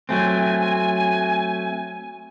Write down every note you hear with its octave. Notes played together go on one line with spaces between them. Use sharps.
F#3 A3 C4 G#5